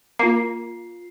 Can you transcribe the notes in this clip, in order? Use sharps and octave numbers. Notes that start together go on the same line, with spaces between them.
A#3 F4 C7